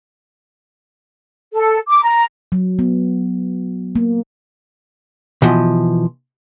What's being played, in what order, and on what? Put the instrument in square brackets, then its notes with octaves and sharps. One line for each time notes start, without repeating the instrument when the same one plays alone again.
[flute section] A4
D6
A#5
[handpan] F#3
B3
A#3
[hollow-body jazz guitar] B2 E3 F3